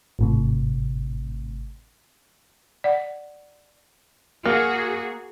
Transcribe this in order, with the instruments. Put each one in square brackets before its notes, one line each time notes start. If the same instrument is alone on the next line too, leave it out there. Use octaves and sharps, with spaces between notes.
[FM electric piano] G#1 A2 C3
[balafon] D5 F#5
[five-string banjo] A#3 [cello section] F#4 G#4